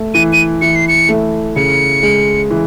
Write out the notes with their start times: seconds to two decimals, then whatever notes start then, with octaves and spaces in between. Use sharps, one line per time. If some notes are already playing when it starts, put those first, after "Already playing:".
Already playing: A3
0.14 E3 D#7
0.33 D#7
0.61 E3 C#7
0.75 C7
0.88 C#7
1.09 A3
1.56 C#3 C#7
2.03 G#3
2.51 E3